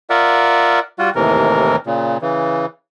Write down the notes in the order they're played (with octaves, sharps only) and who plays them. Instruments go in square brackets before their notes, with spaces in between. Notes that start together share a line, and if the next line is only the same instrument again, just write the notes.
[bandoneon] F4 A#4 D5 E5 F#5
G3 F4 F#4
D#2 A2 C3 E3 A#4
A#2 C#3
C#3 E3